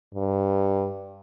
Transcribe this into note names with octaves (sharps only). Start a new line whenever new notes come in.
G2